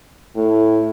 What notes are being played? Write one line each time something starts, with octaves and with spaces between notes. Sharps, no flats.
A2